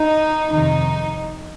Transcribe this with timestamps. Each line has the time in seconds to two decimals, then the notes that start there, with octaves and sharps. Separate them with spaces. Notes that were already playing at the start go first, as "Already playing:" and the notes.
Already playing: D#4
0.53 F2 C3 D#3 D#4